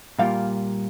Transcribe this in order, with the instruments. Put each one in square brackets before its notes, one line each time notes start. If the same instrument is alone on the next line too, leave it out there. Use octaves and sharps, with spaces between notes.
[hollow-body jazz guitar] A#2 G3 A#3 F4 F5